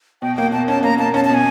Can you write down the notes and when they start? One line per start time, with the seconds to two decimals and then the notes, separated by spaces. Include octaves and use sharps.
0.22 B2 G5
0.37 A#3 G5
0.52 B2 A5
0.68 C#4 A5
0.83 A#3 A#5
0.98 A#3 A5
1.14 C#4 A5
1.24 A5
1.29 B2 G#5